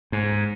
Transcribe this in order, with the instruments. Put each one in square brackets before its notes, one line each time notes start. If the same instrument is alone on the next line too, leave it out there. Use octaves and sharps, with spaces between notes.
[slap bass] G#2